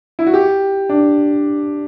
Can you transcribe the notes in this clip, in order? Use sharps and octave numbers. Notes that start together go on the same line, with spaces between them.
E4
F#4
G4
D4